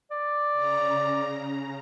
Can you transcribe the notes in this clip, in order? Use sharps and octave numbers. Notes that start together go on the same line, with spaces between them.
D5
C#3 A#5